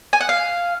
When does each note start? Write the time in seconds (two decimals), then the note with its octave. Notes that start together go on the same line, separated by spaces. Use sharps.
0.13 G#5
0.21 F#5
0.29 F5